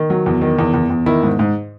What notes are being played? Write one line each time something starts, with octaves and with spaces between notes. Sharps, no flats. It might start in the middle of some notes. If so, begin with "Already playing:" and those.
Already playing: D#3
F#3
E2
D#3
E2
E2
E2
D#3 E4
G#2
G#2